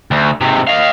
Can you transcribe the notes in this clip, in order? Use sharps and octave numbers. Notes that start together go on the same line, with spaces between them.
D2
G#2 C3
D#5 F5